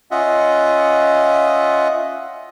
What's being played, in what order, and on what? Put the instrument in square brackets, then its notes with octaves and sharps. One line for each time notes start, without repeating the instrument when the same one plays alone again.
[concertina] C#4 F4 D#5 E5 F#5